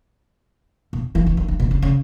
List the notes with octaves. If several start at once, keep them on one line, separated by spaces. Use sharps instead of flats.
B2
E3
E3
D#3
D#3
B2
C#3
C#3